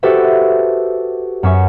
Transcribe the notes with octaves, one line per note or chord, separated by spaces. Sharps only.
F#4 G4 A4 B4 C5 E5
F#2 C#4 E5 C#6